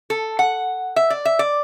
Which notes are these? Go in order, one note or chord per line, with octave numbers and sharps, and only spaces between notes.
A4
F#5
E5
D5
E5
D5